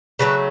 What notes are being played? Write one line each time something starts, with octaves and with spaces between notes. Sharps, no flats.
C#3 F#3 A3 B4